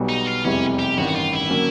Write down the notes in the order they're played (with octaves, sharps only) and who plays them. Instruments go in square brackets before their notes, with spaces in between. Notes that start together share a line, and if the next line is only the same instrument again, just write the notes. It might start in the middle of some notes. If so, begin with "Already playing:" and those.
Already playing: [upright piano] B1 B2 G3
[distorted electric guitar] D#4
F4
[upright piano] F1 E2 C3 E3 G3 [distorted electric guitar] C#4
[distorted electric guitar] G4
[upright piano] A1 G2 D#3 [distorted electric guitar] F#4
[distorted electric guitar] F#4
F4
E4
[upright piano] D3 F#3 A#3 C#4